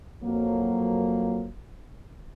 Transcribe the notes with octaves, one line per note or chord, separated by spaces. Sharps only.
F2 F#3 A#3